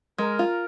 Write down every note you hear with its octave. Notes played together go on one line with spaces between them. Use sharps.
G#3 A#4
F4